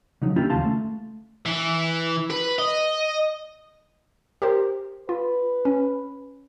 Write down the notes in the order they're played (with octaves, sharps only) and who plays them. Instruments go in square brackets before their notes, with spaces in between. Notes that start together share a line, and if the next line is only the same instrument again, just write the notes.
[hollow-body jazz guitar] C#3 F3 F#3 D#4
A#3 C#4 D4 E4 F4 G4
D#2 C#3 F5 A5 C6
A3
[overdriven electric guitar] E3
B4
D#5
[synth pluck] G4 A#4 C5
[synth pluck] F4 [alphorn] B4
[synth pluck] C#4